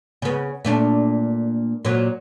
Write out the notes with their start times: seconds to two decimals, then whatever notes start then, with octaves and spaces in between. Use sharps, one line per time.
0.22 C#3 B3
0.65 A#2 A3 D4
1.85 A#2 F#3